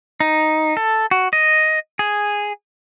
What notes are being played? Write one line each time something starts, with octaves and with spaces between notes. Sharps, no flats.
D#4
A4
F#4
D#5
G#4